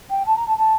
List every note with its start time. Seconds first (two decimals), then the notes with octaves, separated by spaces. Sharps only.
0.10 G5
0.26 A5
0.36 A#5
0.47 A5
0.57 A5